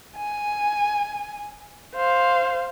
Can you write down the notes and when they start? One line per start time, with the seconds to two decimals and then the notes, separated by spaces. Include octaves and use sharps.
0.17 G#5
1.95 C5 F5